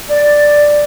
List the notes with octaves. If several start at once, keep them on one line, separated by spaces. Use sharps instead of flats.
D5